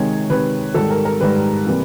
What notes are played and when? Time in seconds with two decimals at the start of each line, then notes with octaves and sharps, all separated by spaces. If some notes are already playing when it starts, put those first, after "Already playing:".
Already playing: C3 D#3 G#3 C#5
0.29 C3 D#3 G#3 B4
0.74 G#2 D#3 G3 A4
0.90 A#4
1.05 A#4
1.20 G#2 D#3 G3 B4
1.66 C3 E3 G3 A#3